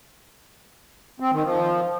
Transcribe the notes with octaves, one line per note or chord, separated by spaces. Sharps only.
C4
D#3
F3